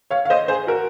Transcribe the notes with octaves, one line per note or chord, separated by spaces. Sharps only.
C#5 F5
F5
C5 D#5
G#4 C5
F#4 A#4